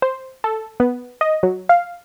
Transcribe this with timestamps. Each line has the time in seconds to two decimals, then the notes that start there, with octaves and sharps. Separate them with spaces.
0.02 C5
0.44 A4
0.80 B3
1.21 D#5
1.43 F#3
1.69 F5